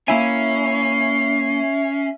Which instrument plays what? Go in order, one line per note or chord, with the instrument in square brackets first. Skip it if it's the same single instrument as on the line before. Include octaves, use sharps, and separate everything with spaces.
[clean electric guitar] A#3 E4 G#5 [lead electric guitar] C#4 [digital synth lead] E5 [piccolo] C7